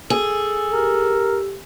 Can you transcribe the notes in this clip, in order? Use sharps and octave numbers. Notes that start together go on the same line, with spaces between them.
G#4 A4
G4 A#4